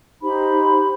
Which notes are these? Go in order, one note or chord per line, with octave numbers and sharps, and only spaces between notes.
D#4 G4 C5 B5